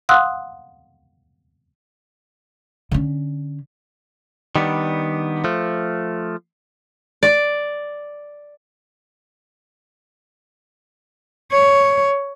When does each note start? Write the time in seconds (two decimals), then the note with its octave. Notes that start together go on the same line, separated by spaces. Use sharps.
0.09 F5 F#5 C6 D#6 E6 F#6
2.91 D3 C#4
4.55 D#3 G3 B3 D4
5.44 F3 A3
7.23 D5
11.51 C#5